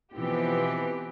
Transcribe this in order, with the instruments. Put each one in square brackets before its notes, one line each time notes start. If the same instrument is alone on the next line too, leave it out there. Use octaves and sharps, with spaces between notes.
[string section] B2 E3 F3 B3 C4 G4